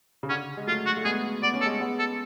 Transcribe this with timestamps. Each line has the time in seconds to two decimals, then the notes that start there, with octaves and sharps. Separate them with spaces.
0.23 C#3
0.29 D3 C#4
0.57 G#3
0.67 F#3 A3 F4
0.86 F#4
0.97 A3
1.05 G#3 B3 G#4
1.43 B3 D5
1.54 C#4
1.61 A4
1.65 G#3 B3
1.80 G#3 B3
1.99 A4